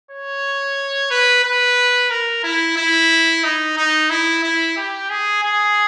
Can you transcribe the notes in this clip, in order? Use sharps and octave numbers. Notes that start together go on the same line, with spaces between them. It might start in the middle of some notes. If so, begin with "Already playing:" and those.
C#5
B4
B4
A#4
E4
E4
D#4
D#4
E4
E4
G4
G#4
G#4